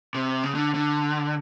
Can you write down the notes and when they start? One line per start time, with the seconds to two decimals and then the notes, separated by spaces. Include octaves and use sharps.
0.15 C3
0.43 C#3
0.55 D3
0.74 D3